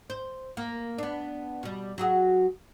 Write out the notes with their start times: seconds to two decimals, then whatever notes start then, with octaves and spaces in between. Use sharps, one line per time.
0.10 C5
0.57 A#3
0.98 B3 D4
1.63 B2 G3
1.98 F#3 F#4 G#4